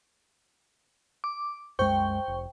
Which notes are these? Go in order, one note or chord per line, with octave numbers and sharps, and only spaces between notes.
D6
C2 F#2 G#3 C5 G5 C#6
F1